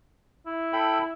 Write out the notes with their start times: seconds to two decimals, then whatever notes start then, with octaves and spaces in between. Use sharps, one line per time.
0.46 E4
0.73 A4 G5 B5